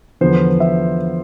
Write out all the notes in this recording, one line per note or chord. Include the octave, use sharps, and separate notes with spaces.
E2 D3 F3 B3 C5
E5